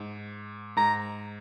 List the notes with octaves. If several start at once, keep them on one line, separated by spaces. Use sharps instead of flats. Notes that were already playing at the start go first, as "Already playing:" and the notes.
Already playing: G#2
G#2 A#5